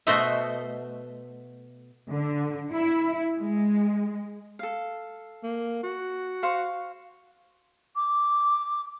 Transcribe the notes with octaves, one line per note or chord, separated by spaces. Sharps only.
B2 A3 F#4 C5 D#5 E5
D3
E4
G#3
A4 F5
A#3
F#4
C5 F5 C#6
D6